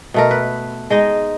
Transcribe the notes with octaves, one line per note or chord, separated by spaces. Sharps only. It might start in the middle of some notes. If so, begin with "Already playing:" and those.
B2 A3 A#4
B4
G#3 D#4 D#5